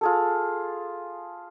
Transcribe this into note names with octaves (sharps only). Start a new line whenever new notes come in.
F4 G#4 A4